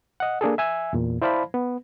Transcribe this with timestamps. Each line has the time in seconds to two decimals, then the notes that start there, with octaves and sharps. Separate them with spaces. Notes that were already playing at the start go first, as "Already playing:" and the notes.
0.20 D#5 F#5
0.41 A#3 D4 G#4 A4
0.58 E5 G#5 E6
0.93 E2 A#2
1.22 E4 C5 D5 F5 A5 B5
1.54 B3